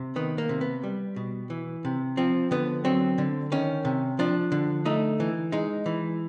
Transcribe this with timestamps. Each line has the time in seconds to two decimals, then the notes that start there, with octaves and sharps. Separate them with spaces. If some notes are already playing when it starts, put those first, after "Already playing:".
Already playing: C3
0.16 D#3 B3
0.38 A#3
0.49 C3
0.61 B3
0.83 G3
1.16 B2
1.50 E3
1.85 C3
2.17 F3 C4
2.51 D3 B3
2.85 F#3 C4
3.18 D3
3.52 D#3 C#4
3.85 C3
4.19 F3 D4
4.52 D3
4.86 A3 D#4
5.20 E3
5.52 G#3 D#4
5.86 E3